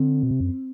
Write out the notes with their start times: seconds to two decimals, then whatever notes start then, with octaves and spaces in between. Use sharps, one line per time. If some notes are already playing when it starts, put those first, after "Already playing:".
Already playing: D3 C4
0.23 B2
0.31 C3
0.40 F#2